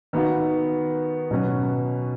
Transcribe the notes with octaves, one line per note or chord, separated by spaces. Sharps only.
D#3 B3 F#4
B2 F#3 C#4 B4